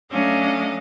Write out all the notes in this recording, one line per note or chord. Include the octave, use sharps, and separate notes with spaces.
F#3 A3 C#4 D4 D#5 F5